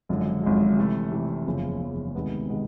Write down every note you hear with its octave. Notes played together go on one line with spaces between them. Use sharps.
G#1 F#2 D3 F3 G#3
G#1 F#2 D3 F3 G#3
C3 E3 A3
C3 E3 A3
F#1 E2 C#3 F3
F#1 E2 C#3 F3
D2 C3 D#3 G#3 B3
C3 D#3 G#3 B3